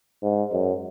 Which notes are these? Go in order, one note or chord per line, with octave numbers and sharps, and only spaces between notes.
G#2
F#2